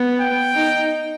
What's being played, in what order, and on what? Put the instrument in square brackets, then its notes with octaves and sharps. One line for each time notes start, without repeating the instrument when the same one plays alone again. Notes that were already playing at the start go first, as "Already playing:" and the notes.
Already playing: [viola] B3
[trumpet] G5
[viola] D#4